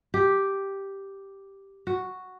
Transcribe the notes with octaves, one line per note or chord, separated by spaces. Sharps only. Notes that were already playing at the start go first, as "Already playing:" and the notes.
G4
F#4